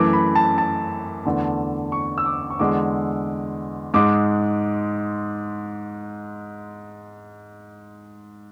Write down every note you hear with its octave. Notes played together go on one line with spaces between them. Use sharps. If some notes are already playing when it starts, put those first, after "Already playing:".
Already playing: F#2 E3 A3 D6
B5
A5
A5
E2 D3 A3
C#6
E6
D6
C#6
E2 D3 G#3 D6
G#2 G#3 D6